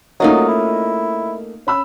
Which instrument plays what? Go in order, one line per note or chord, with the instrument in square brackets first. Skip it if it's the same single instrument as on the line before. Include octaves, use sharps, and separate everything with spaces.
[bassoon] F#3 [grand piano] A3 A#3 C#4 [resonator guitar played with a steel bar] D#4 F4 D#5
[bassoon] E4
[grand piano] C#4 B5 E6